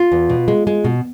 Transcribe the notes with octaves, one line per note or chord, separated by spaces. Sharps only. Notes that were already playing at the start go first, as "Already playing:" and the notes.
Already playing: F4
E2
B2
G#3
G#3
B2